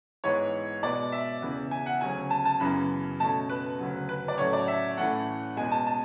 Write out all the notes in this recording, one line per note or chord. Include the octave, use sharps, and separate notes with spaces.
G#2 E3 B3 C#5
B2 G#3 B3 D5
E5
E2 C#3 E3 B3
G#5
F#5
D2 C#3 F#3 C#4 G#5
A5
A5
F#2 C#3 E3 B3 B5
B2 A3 C#4 A5
B4
D2 C#3 F#3
B4
D5
A2 F#3 A3 C#4 C#5
D5
E5
A2 E3 A3 C#4 F#5
E2 B2 G#3 B3 G#5
A5
A5